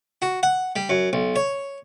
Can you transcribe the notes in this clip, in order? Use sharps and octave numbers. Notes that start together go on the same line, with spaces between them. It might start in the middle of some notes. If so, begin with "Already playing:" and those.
F#4
F#5
G3
F#2
B1
C#5